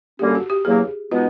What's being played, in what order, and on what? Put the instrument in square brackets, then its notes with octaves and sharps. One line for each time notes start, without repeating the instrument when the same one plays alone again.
[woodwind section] F#2 D3 G3 A#3 C#4 [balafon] G4
[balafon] F#4
G4
[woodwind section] E2 C#3 F#3 A#3 [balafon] G#4
[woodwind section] B2 G#3 B3 D#4 [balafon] F4